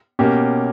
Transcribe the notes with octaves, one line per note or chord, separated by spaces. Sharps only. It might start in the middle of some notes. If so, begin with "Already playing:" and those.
B2 A#3 C#4 G4